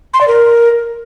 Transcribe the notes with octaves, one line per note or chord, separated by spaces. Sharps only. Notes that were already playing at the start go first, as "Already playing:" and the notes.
C6
D5
A#4